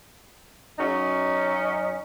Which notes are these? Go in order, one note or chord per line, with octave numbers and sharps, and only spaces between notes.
F#2 F#3 C#4 D#4